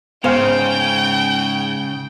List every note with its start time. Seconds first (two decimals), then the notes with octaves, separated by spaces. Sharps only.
0.24 G#2 C#3 B3 C5 F5 G5